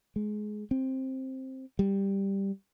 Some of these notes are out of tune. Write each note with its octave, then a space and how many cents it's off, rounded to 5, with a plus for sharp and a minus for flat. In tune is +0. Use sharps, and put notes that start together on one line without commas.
G#3 +20
C4 +10
G3 +5